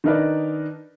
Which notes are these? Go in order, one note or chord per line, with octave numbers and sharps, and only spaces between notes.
D#3 D4 D#4 A#4 B4 D5